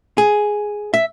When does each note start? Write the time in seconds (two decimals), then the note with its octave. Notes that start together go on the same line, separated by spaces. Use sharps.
0.18 G#4
0.94 E5